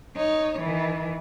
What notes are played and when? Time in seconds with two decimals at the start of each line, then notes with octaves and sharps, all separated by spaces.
0.16 D#4 C#5
0.59 D#3 E3